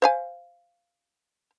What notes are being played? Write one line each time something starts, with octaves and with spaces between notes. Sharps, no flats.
C5 F5 G#5